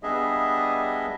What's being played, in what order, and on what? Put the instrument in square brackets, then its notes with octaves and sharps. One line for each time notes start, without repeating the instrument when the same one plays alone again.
[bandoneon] G3 B3 D4 G#4 D#5 E5